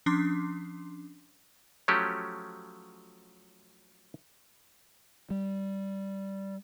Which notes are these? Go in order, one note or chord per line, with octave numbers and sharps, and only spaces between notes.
F3 C#4 D4 C6 D6 C7
F3 F#3 A3 C#4 G4
G3